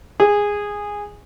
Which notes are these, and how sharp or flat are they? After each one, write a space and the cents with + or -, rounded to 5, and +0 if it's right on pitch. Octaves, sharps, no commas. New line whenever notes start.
G#4 -10